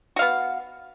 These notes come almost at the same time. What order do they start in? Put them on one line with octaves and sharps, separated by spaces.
F#4 F5 B3